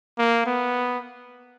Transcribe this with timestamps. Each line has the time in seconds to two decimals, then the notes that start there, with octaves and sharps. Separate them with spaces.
0.18 A#3
0.46 B3